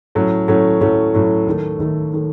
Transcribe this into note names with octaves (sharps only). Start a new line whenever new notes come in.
A2 F#3 A3 C#4
A2 F#3 A3 C#4
A2 F#3 A3 C#4
A2 F#3 A3 C#4
D#2 D#3 A3
D#2 D#3 A3
D#3 A3